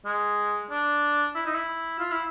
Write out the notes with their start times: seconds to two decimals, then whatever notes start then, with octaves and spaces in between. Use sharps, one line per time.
0.06 G#3
0.70 D4
1.35 E4
1.46 D#4
1.55 E4
1.99 F4
2.11 E4